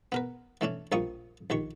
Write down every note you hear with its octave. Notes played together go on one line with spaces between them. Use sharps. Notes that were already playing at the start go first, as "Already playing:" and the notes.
B3 A#4 B4
E3 A3 C#4 D4
A#1 F3 G3 A#3 C#6 D#6
A#1 D#3 G4 C#6